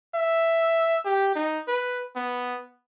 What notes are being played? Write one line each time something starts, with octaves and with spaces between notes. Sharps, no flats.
E5
G4
D#4
B4
B3